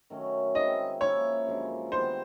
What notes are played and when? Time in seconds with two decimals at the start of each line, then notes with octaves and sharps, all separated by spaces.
0.10 D#3 F#3 A3 C#4
0.55 D#3 G#3 C4 E4 D#5
1.01 F3 A#3 C#4 E4 C#5
1.46 F#2 D3 F3 G#3
1.92 D#3 G3 B3 C5